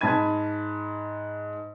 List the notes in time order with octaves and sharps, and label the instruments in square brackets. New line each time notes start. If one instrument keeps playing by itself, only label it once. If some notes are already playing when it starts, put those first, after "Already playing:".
[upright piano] G#2 A5 B5 G#6 D#7